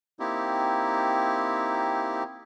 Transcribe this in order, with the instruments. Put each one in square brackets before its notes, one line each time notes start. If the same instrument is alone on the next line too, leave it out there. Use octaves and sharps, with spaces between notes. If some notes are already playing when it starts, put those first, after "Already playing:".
[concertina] A#3 C4 D#4 E4 G4